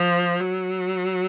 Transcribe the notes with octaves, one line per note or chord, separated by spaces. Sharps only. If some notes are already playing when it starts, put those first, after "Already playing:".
Already playing: F3
F#3